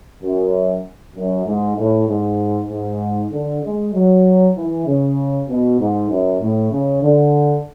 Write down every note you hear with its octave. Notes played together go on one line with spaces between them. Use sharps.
F#2
F#2
G#2
A2
G#2
G#2
D3
G#3
F#3
E3
C#3
B2
G#2
F#2
A2
C#3
D3